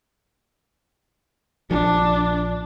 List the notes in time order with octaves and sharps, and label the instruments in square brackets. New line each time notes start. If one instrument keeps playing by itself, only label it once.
[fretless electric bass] A#1 F3 [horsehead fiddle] D4